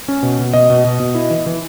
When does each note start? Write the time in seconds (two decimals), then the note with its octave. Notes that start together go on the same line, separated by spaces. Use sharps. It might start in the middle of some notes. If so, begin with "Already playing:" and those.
0.08 C#4
0.23 B2
0.39 B2
0.53 B2 D#5
0.70 B2
0.85 B2
1.00 B2
1.15 E4
1.30 E3
1.46 E3